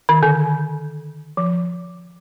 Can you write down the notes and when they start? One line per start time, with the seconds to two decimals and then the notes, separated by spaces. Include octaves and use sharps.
0.09 D#3
0.23 D3
1.37 F3